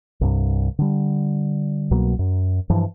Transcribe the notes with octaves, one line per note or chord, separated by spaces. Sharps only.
C2 G2
D3 G3
C2 B2 F#3 A#3
F#2
G2 E3 F3